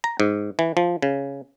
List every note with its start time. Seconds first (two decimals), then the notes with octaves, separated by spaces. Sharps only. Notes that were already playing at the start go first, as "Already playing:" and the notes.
0.04 A#5
0.20 G#2
0.59 E3
0.77 F3
1.02 C#3